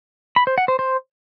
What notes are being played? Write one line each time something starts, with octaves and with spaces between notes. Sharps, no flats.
B5
C5
F#5
C5
C5